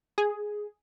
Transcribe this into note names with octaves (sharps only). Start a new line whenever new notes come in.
G#4